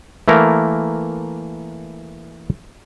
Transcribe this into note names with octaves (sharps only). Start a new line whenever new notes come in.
E3 A3 A#3 A#4